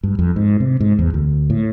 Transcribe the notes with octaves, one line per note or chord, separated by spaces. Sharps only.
G2
F2
G#2
C3
G#2
E2
D2
A2